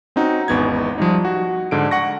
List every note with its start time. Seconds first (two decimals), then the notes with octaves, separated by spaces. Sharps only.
0.16 C4 C#4 D#4 F#4
0.48 G#1 E2 B3 D#4 G#6
0.98 F3 G3 D#4
1.25 F#4
1.71 G#2 D3 D7
1.91 F#5 C#6 A#6